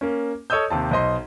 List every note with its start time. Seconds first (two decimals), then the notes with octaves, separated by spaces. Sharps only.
0.01 A#3 C#4
0.50 A4 C#5 D#5 D#6 E6 G6
0.70 D#2 C3 A5
0.91 B1 C5 D#5 C6